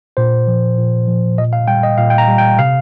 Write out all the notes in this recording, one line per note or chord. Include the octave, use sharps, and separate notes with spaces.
A#2 C5
F3
A#2
F3
A#2 D#5
F5
G3 G5
D#5
A#2 F5
G5
A#5
G3
G5
C3 F5